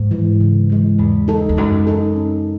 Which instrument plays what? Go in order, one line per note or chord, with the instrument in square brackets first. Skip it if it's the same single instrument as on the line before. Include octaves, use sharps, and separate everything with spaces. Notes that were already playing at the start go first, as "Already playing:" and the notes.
Already playing: [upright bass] G#2
[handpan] E3 G#3
C#3
E3 G#3
[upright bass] E2 [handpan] G#3
[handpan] D#4 A4
[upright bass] E2
[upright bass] F#2 [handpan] G#3
[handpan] D#4 A4
C#4